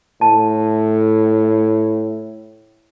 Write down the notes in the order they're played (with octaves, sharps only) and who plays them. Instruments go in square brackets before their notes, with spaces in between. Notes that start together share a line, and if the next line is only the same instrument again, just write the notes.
[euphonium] A2 [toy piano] A5